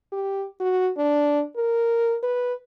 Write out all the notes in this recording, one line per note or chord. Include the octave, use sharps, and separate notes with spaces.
G4
F#4
D4
A#4
B4